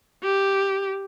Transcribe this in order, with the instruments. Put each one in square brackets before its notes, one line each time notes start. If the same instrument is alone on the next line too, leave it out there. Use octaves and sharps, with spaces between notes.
[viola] G4